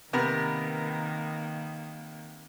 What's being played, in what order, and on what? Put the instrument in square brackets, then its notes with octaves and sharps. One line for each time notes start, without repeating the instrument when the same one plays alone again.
[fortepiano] C3 B3 A#4 [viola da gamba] D#3 A#3